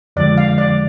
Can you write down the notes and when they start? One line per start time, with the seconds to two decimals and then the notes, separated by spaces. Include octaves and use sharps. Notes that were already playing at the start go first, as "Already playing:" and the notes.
0.16 F2 D3 F3 G#3 D5
0.38 F5
0.58 D5